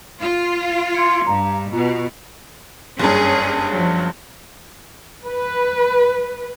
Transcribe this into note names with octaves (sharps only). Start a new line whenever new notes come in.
F4
C6 G#6 C#7
G2 F5 A#5
B2 F4
F#1 G2 C#4 G#4
F3 F#3
B4